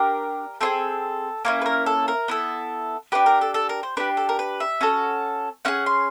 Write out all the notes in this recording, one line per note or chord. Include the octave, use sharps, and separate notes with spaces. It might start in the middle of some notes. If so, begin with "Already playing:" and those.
Already playing: D4 G4 A#4
C4 F4 G#4 A4
A#3 C#4 E4 A#4
B4
A#4
A4
A#4
B3 E4 A4
D4 G4 B4
A#4
A4
A4
A#4
C5
D4 G4 B4
A4
A#4
B4
E5
C#4 F#4 A4
C#4 E4 G#4 F#5
C6